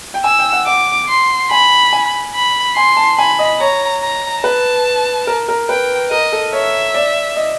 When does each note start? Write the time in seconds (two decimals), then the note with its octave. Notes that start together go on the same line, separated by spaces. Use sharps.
0.14 G5
0.24 G#5 E6
0.39 G5
0.52 F#5
0.67 F#5 D6
1.08 C6
1.50 G#5 B5
1.93 G#5
2.34 B5
2.76 G#5 C6
2.97 A5
3.18 G#5 B5
3.39 D#5
3.60 C#5 A#5
4.01 A#5
4.44 B4 A5
5.27 A#4
5.48 A#4
5.69 B4 G5
6.11 A#4 D#5
6.32 A4
6.52 C#5 E5
6.94 D5
7.36 D#5